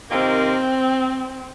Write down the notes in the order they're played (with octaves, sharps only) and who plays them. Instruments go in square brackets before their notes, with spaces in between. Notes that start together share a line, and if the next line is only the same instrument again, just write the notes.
[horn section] C3 D#3 A#3 F4 A#4 [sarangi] C4